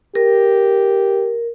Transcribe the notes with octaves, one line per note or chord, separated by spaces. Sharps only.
G4 A#4